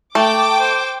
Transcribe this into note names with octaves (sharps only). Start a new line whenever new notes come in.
A3 G5 A5 D6
C5